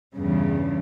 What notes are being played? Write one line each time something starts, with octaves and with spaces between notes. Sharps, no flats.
E2 G2 C#3